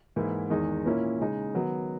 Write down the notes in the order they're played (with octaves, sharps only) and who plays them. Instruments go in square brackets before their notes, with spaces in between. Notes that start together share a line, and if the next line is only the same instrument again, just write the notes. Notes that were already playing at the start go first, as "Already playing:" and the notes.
[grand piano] G#2 E3 A#3 E4
E2 D#3 G#3 D#4
A#2 A#3 C#4 E4
C#3 G#3 D#4
D#3 F#3 B3